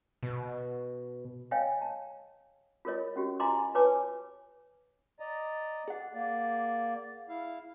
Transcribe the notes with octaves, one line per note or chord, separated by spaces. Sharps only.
B2
C#5 D#5 F5 G5 G#5
A5
F4 G#4 A#4 C#5 D#5
C#4 F#4 G4
F4 D#5 G#5 A#5 C6 D6
F4 B4 C#5 G#5 A5 D6
D5 D#5 A#5
G#4 F#5
A#3 D5
E4 F5